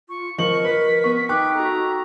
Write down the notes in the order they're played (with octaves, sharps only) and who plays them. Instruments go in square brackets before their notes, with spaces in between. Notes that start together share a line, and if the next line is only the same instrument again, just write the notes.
[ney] F4 [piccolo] C#6
[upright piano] F3 F#7 [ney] A#4 [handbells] D#5 [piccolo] C#6
[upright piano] B4 [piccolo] B6
[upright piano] B3 [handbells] C#6
[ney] D#4 [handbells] G5 C#6 F#6 [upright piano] D6
[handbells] F#4 A4 [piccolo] A#5